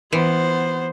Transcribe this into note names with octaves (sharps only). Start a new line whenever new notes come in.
E3 B3 C5